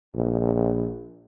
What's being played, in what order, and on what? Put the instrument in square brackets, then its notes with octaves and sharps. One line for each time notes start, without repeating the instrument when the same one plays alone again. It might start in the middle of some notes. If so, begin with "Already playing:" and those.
[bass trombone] A#1